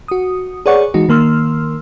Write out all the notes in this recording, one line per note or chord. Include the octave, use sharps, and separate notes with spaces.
F#4 D#6
G#4 B4 C#5 D5 F#5 C#6
E3 G#3 D#4 F#4
D#3 A#3 C6 E6 F6